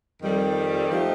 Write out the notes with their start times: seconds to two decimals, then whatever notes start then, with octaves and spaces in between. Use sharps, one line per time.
0.22 F2 D#3 G3 C4
0.91 F3 A3 D#4 G4 C5